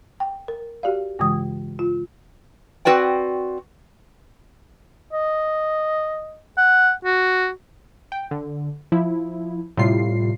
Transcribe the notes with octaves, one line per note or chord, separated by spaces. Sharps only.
G5
A#4
F#4 G4 D5 F5
G2 C#3 E3 G#3 D#6
F4
C4 F#4 B4 D5 G5
D#5
F#5
F#4
G5
D3
F3 E4
A2 C3 G3 F4 C7